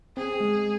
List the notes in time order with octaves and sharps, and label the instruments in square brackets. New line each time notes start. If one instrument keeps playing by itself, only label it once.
[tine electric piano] C4 [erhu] G#4
[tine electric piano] G#3